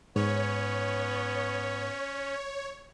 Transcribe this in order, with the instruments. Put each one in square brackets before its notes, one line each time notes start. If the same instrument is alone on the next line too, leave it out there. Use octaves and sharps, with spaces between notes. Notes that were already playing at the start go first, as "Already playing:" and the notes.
[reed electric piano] G#2 [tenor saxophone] B3 [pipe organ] C#4 [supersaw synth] C#5